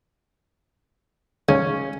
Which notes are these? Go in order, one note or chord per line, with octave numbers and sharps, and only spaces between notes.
C#2 C#4